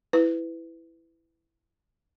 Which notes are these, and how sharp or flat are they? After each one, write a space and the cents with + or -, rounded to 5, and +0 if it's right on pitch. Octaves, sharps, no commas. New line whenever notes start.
E4 +0 B4 +20